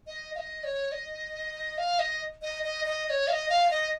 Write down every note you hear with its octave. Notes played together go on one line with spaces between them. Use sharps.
D#5
F5
D#5
C#5
D#5
F5
D#5
D#5
D#5
D#5
D#5
C#5
F5
D#5
F5
D#5